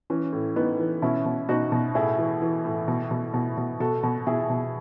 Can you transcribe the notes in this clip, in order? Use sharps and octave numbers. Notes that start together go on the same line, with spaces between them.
E3 C#4
A2
E3 B3 D#4
E3
B2 C#4 E4
B2
B2 D#4 F#4
B2
A2 E4 G#4
E3
E3
A2
B2
B2
B2
B2
B2 F#4 A4
B2
B2 E4 G#4
B2